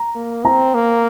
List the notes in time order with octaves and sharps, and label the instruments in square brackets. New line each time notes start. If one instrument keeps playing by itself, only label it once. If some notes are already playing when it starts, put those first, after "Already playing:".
Already playing: [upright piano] A#5
[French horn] A#3
[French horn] C4 [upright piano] A#5
[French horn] A#3